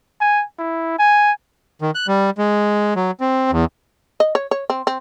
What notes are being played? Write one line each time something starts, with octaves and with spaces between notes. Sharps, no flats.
G#5
E4
G#5
D#3
F#6
G3
G#3
F#3
C4
E2
D#5
C#5
C#5
C4
C4